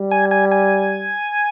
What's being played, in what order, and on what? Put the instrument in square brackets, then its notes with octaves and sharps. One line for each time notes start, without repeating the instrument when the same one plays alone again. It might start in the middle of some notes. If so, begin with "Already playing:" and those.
Already playing: [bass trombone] G3
[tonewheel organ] G#5
G#5
G#5